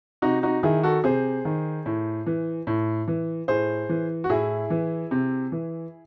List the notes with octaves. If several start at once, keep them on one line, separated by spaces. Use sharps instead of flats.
C3 D#4 F#4
D#4 F#4
D#3 E4 G#4
F#4 A4
C3 G#4 C5
D#3
A2
E3
A2
E3
A2 G#4 C5
E3
F#4
A2 E4 G#4
E3
C3
E3